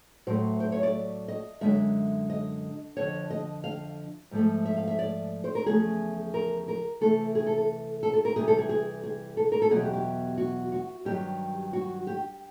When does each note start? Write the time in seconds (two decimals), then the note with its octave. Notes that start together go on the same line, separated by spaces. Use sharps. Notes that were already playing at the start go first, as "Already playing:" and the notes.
0.27 A2 F#3 A3 C5
0.60 C5
0.72 C#5
0.83 D5
1.28 D#5
1.61 F#2 D3 F3 G#3 E5
2.30 D#5
2.97 F2 D3 F3 C#5
3.30 D#5
3.64 F5
4.31 G#2 F3 A3
4.65 E5
4.76 F5
4.88 E5
4.99 D5
5.44 C5
5.55 A#4
5.66 E2 C#3 F3 A3 G#4
6.34 A#4
6.68 A#4
7.01 C3 E3 A3 A4
7.35 G#4
7.47 A4
7.58 A4
8.03 A4
8.14 A4
8.25 A#4
8.36 C3 E3 G3 G#4
8.48 A4
8.59 G#4
8.69 G#4
9.03 G#4
9.37 A4
9.52 A#4
9.62 A4
9.71 E2 B2 F#3 G#4
9.82 G4
9.93 G4
10.38 F#4
10.72 F#4
11.05 G2 D#3 F#3 G4
11.73 F#4
12.07 G4